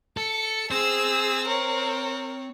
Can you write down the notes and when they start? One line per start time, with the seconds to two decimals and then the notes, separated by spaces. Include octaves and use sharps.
0.17 A4 C#7
0.71 C4 G#4 C5 E6
1.48 A#4 C#5